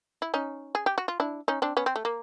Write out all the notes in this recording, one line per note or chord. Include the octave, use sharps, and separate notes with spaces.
E4
C#4 D#4
G#4
G4
F#4
F4
D4 E4
C#4 D#4
C4 D4
B3 C#4
C4
A3
A#3